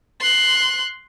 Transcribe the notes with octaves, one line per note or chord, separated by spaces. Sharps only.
C6 F#6